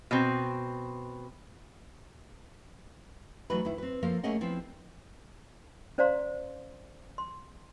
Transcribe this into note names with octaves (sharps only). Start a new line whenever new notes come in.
B2 C4
E3 F#3 A3 D#4 F#4 B4
D#3 E4
C4 B4
F3 A#3 A4 A#4 F5
A3 A#3 C#4 G#4 D#5 F#5
F3 B3 C4 E4
C#4 C5 D5 F5 A#5 C6
C6